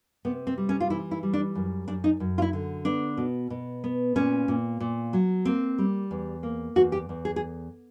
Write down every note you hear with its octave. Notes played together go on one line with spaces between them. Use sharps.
C3 B3
C4
G3
C#4
F4
E3 E4
E4
G3
D4
F#2
F#2 D4
D#4
F#2
F4
E4
D3
B3 D4
B2
B2
B3
A#2 C#4
A#2
A#2
F#3
A#3 C4
G3
E2
A#3
E2 F#4
G4
E2
G#4
G#4